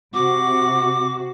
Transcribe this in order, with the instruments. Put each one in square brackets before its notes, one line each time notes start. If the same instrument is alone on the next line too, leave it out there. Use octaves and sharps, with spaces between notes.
[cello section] C3 F#4 [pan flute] D6